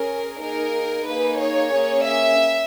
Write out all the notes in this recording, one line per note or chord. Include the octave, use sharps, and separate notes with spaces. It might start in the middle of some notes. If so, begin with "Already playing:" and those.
Already playing: C#4 G#4 A#4
A#3 D#4 G#4 A#4
A#3 D#4 G#4 B4
C#5
A#3 C#4 G#4
E5